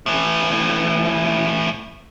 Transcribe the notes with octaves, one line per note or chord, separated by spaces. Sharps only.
A2 E3